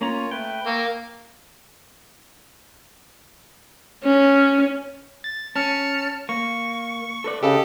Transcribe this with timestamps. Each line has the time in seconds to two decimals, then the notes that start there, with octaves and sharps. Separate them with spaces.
0.01 A#3 C#4 F4 C#5 A#5
0.31 A3 B4 G5
0.67 A#3 C#6 E6
4.04 C#4
5.24 A6
5.56 C#4 A5 F6 C#7
6.29 A#3 C#6
7.24 A4 B4 D5
7.43 C#3 G4 A4 D#5